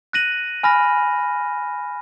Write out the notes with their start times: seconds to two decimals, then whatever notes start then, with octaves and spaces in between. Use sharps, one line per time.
0.13 F#6 A#6 D#7 F#7
0.63 G#5 B5 F6 A#6